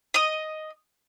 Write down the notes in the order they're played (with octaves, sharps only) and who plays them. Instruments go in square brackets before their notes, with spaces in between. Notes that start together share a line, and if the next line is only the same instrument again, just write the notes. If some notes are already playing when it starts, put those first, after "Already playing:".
[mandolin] D#5 D#6